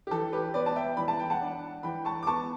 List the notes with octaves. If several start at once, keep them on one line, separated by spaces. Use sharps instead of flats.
G4
E3 A4
G4 B4
B3 B4 D5
A5
E5 G5
E3 B5
A5
G5
F#5 A5
D4
E3 G5 B5
A5 C#6
D6
B3 A5 C#6